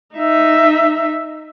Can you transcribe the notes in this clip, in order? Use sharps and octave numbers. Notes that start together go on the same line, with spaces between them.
D#4 E5